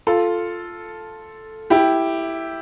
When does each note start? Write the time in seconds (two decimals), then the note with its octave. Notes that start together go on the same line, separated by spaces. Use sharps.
0.07 F4 A4
1.70 E4 G4